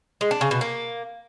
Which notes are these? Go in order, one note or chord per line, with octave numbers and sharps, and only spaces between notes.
G#3
D4
C#3
B2
A#3